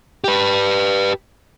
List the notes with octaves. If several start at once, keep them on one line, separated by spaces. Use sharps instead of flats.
G4 B4